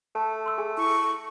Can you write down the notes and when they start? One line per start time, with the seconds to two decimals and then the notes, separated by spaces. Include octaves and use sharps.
0.15 A3 A5
0.46 C6 E6
0.58 G#4 G#5
0.77 E4 C#6